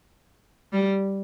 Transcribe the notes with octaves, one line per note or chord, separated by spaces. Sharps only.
G3